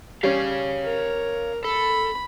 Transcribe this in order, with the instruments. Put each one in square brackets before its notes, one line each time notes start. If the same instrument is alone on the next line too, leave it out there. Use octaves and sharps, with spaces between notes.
[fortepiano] G3 C#4 [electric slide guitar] C#5 F5
[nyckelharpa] A#4
[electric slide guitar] A4 [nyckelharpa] B5